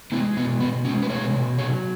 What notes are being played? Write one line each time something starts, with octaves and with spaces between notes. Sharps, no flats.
G#3 B3 E4
B2 B3
B2 B3
G#3 C#4
B4
B2 G#4 C#5
B2
F#3 G#4 C#5